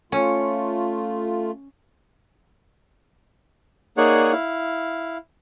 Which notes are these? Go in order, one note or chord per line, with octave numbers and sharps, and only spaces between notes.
A3 C#4 F4
A#3 D#4 G#4 C#5 D5 F#5
E4 F5